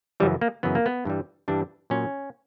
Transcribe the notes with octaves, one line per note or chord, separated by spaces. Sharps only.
F#2 C#3 E3 G3
A#3
F#2 C#3 E3 B3
A#3
B3
G2 E3 G3
G2 E3 G3 D4
A#2 F#3 C#4